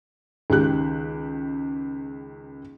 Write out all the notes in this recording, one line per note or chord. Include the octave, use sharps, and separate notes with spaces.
C#2 D#3 G4 F#6